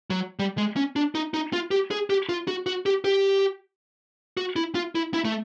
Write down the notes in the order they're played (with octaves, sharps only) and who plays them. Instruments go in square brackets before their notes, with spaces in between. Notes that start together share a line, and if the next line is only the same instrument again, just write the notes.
[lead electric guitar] F#3
G3
G#3
C#4
D4
D#4
D#4
F4
G4
G#4
G4
F4
F#4
F#4
G4
G4
F#4
E4
F4
E4
E4
A3